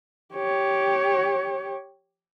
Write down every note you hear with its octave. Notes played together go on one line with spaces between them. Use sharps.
G4 C#5